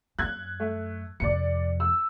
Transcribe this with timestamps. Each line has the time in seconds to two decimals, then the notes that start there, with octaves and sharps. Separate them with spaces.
0.19 F#2 F#6 G#6
0.60 A3
1.20 F2 C3 D5 C#7
1.80 E6